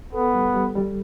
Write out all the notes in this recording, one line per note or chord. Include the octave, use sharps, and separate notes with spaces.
B3 A4
G3
G3
G3